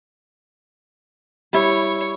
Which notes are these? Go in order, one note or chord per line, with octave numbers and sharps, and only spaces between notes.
G3 E4 C#5